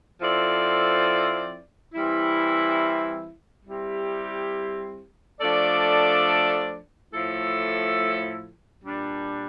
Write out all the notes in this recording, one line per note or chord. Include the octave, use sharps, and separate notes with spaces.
F3 C4 E4 A4 D5
E3 G3 C4 E4
G3 C4 E4 G4
F3 A3 D4 A4 D5
A2 F3 A3 E4 A4
A#2 G3 D4